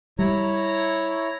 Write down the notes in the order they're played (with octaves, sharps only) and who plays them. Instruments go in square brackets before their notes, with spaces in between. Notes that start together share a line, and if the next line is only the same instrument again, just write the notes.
[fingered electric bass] G3 [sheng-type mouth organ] E4 C#5 A#5